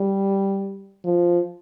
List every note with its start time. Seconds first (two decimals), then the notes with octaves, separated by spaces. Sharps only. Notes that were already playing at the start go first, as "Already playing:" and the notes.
Already playing: G3
1.04 F3